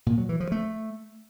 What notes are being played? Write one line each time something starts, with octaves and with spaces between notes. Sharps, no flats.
A#2
F#3
E3
F3
A3